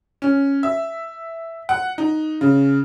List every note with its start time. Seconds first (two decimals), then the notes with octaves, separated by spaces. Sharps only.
0.22 C#4
0.63 E5
1.69 F#5
1.98 D#4
2.41 C#3